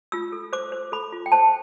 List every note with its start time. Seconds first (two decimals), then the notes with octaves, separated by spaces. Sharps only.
0.12 F4 E6
0.32 A4
0.53 C5 D6
0.72 C5
0.92 A4 B5
1.12 F4
1.26 G5
1.32 C5 A5